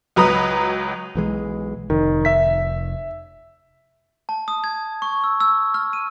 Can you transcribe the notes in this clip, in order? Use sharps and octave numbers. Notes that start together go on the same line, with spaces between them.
C#2 F#3 B4 A#5 D#6
B1 E3 G#3
F1 D#3
E5 B6
A5
D#6
G#6
C#6
E6
E6
F6
D#7